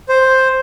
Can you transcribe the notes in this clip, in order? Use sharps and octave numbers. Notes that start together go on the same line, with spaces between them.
C5